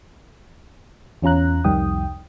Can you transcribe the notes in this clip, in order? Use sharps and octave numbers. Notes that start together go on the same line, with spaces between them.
E2 C#4 F4 A#5 F#6
C2 F2 D#3 G3 G5 D#6